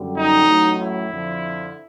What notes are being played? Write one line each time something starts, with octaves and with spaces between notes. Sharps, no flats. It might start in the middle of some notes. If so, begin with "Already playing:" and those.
Already playing: F#2 D3 G3
D#4
A1 A2 F#3
E4
F2 D3 F3